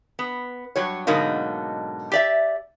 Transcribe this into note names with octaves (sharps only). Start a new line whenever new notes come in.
B3
G2 F#3 C#5
G#2 B2 D3 F#3 A#3 D#4
G4 D5 E5